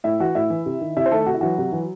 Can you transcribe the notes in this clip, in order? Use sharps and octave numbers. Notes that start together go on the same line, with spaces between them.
A2 E4 E5
E3 F#4 F#5
A2 E4 E5
E3
C3
D#3
C3 E4 E5
C5
D#3 A3 A4
C3 F#4
E4
E3 F#3 F#4
C3
E3